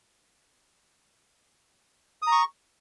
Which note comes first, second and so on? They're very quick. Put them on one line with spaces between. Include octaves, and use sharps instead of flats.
D#6 A#5 C#6